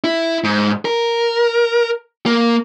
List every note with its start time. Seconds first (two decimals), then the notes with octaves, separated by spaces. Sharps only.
0.04 E4
0.44 G#2
0.85 A#4
2.26 A#3